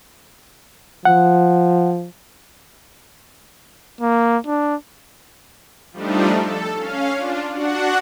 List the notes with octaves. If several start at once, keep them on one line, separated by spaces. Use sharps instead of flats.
F3 F#5
A#3
D4
F3 G3 A3 D4 D#4
A4
C#4 F5
D4 F4
D4 F#4 F#5